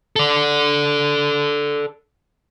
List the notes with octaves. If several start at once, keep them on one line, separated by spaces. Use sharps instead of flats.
A4 D5